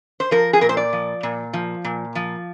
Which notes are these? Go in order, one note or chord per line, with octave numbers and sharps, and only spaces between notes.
C5
F3 A#4
G#4
A#2 A#4
C5
D5
F3
A#2
F3
A#2
F3